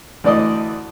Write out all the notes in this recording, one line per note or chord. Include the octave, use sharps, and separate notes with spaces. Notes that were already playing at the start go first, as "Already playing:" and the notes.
D2 E3 D5 D#5 D#6